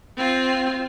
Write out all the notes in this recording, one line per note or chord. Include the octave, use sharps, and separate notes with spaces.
C4 F4